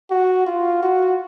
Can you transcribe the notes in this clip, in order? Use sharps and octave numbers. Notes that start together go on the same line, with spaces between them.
F#4
F4
F#4